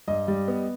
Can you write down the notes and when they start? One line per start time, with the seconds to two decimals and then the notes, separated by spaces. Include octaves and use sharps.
0.08 G2 D#5
0.28 G3
0.48 B3